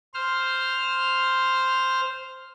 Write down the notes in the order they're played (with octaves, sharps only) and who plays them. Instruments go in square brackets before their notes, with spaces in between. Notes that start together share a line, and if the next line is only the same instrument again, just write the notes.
[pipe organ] C5 F6